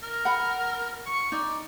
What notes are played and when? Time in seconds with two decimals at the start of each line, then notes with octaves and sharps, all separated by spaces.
0.03 A#4
0.25 F#5 B5
1.06 C#6
1.32 D#4 D5